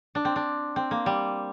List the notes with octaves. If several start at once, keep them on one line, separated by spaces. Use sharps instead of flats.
D4
C4
D4
C4
A#3
G3